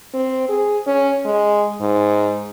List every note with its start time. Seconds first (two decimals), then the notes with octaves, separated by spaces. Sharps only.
0.14 C4
0.49 G#4
0.87 C#4
1.25 G#3
1.81 G#2